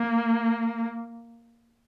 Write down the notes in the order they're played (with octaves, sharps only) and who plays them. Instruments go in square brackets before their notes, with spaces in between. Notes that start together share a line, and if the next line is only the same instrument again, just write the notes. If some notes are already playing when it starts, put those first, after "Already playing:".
Already playing: [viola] A#3